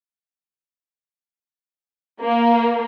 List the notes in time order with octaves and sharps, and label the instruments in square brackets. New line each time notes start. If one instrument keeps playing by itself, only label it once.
[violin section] A#3